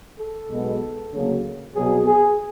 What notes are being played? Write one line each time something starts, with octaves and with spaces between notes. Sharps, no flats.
A4
B1 B2 G#3 B3
D2 C#3 F#3 A#3
C2 B2 F#3 B3 G#4
G#4